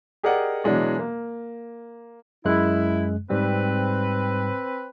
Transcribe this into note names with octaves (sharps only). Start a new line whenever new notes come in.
G4 G#4 A#4 D5 D#5 F#5
B2 E3 F#3 G#3 D4
A#3
F#2 G#3 E4 F#6
G#2 G3 C4 B4